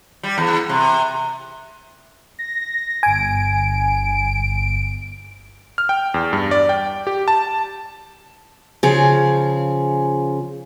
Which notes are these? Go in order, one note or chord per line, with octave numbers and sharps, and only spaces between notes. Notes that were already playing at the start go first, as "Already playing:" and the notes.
G3
E2
C3
A#6
G1 G#5 D7
F6
G5
E2
G2
D5
G5
G4
A5
C#3 F3 G#4